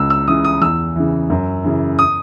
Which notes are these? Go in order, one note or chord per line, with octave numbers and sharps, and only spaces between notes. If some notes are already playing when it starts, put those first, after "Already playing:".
Already playing: C#2 E6
E6
C#3 E3 D#6
D#6
E2 E6
C#3 E3
F#2
C#3 E3
D#6